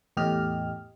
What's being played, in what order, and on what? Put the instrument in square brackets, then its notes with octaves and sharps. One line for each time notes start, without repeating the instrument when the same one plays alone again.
[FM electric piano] E2 A2 G4 D#5 F6